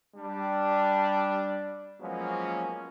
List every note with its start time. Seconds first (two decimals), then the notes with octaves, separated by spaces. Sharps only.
0.16 G3 D4
2.01 F3 F#3 G#3 A#3 B3 C#4